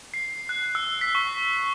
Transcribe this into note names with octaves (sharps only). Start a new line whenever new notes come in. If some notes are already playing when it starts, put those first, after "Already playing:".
C7
F#6
E6
B6
C#6